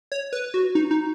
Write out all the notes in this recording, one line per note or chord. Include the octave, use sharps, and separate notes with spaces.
C#5
B4
F#4
D#4
D#4